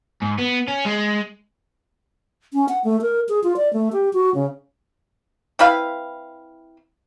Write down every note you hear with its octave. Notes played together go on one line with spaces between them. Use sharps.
G#2
B3
C#4
G#3
C#4
F#5
A3
A#4
G#4
F4
D5
A3
G4
F#4
C#3
C4 E4 B4 F5